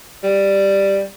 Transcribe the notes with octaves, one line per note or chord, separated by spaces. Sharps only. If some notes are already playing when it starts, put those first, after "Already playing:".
G3